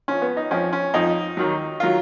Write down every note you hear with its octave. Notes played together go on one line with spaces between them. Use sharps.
F2 F3 C#4
B3
D#4
F2 F3 C#4
C#4
F2 F3 D#4
D#2 D#3 F#3
D#3 F#3 F4